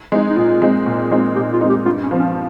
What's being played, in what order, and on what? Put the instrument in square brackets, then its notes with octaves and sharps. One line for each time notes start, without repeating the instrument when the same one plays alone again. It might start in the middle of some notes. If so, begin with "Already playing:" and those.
[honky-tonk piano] G#3 C4 D#4
[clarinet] D#4
[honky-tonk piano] A#2 [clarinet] F4
[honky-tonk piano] G#3 C4 D#4
A#2
G#3 C4 D#4
[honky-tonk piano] A#2 [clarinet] G4
[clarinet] F4
[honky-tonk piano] G#3 C4 D#4
[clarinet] G4
[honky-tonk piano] G2 [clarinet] F4
[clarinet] C#4
[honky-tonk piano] F3 C4
[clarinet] C#4